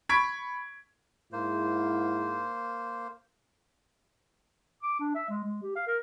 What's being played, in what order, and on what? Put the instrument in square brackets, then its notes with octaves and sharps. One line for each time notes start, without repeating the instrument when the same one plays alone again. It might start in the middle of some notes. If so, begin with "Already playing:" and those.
[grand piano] B5 C#6 G#6 B6 D7
[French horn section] G#2 E4 [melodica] A#3 C5
[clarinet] D6
D4
E5
G#3
G#3
G4
F5
A#4